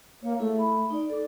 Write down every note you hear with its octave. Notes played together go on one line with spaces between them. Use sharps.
A#3 C#5
A3 E4 G#4
B5
D#4 D5
A4 D5 D6